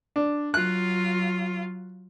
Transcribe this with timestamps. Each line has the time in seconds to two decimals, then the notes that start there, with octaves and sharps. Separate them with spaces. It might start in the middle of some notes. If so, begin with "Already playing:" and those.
0.16 D4
0.54 F#3 F4 F#6